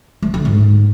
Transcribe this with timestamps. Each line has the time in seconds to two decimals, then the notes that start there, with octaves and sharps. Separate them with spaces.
0.22 A3
0.34 D3
0.45 G#2